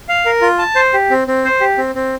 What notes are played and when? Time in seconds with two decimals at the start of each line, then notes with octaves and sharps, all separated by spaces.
0.09 F5
0.26 A#4
0.41 F4
0.58 A5
0.75 C5
0.93 G4
1.10 C4
1.28 C4
1.45 C5
1.60 G4
1.78 C4
1.95 C4